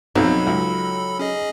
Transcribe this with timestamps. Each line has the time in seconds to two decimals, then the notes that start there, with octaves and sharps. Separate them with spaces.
0.15 B1 F2 F#3 D#4 A4 B5
0.47 C#2
1.19 C#4 G#4 D#5